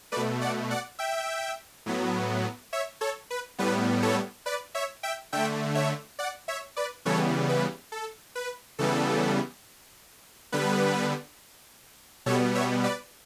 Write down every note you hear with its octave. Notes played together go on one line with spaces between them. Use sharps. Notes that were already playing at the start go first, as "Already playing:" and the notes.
B2 A3 B4 D5
D5 F#5
D5 F#5
E5 G5
A2 F#3 B3
C#5 E5
A4 C#5
B4
A2 G3 B3 B4
A4 C#5
B4 D5
C#5 E5
E5 G5
D3 A3 E5 G5
C#5 E5
D5 F#5
C#5 E5
B4 D5
C#3 E3 G3 B3 A4 C#5
B4
A4
B4
C#3 E3 G3 B3 A4
D3 G3 B3 B4
B2 G3 B3 A4 C#5
C#5 E5
B4 D5